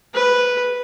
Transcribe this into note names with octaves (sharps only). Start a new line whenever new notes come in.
B4